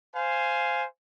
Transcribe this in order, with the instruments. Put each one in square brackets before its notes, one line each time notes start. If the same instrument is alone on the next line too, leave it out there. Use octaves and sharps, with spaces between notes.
[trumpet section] C5 F5 G#5